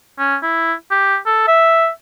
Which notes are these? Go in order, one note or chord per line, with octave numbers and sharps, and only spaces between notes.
C#4
E4
G4
A4
E5